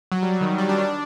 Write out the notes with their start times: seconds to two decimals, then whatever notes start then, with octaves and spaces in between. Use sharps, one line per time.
0.12 F#3
0.23 G3
0.33 F#3
0.41 D#3
0.47 F#3
0.58 G3
0.69 D4
0.81 D4